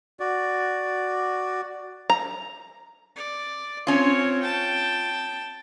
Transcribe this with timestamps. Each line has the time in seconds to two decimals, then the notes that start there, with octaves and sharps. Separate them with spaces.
0.20 F#4 D5
2.10 A#5
3.16 D5
3.87 C4 C#4 F4 C#5
4.42 G5 A5